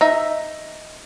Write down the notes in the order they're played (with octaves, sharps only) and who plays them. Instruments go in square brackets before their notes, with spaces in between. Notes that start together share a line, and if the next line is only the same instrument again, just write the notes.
[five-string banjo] D#4 E5